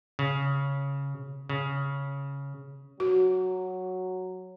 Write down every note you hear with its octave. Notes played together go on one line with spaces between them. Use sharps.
C#3
C#3
F#3 F#4